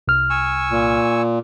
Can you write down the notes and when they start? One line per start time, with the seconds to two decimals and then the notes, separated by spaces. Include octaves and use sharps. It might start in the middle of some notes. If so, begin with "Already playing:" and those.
0.08 C2 F6
0.30 G#5 C#6 E6
0.71 A#2